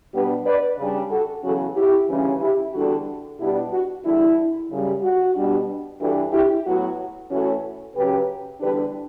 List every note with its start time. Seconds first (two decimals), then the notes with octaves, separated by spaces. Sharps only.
0.13 B2 G3 B3 D4 G4 B4
0.46 B4 D5
0.78 C#3 G3 D4
1.11 F#4 A4
1.43 E2 C#3 F#3 C#4 F#4 A4
1.76 E4 G4
2.08 D2 C#3 E3 G3 C#4
2.41 E4 G4
2.73 E2 D3 G3 D4 F#4 A4
3.39 B2 G3 B3 D4 E4 G4
3.71 F#4
4.04 E2 D3 G3 E4
4.69 F#2 C#3 G3
5.02 F#4
5.34 B2 G3 D4
5.99 G2 E3 G3 D4 F#4 A4
6.32 E4 G4
6.65 A2 F#3 B3 F#4
7.30 A2 E3 A3 C#4 F#4 A4
7.95 C#3 F#3 C#4 G4 B4
8.60 E2 D3 G3 D4 G4 B4